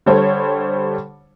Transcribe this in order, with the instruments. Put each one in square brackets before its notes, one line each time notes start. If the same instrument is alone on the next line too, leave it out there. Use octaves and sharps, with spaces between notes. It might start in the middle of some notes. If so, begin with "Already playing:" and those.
[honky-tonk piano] D3 G3 A4 C5 C#5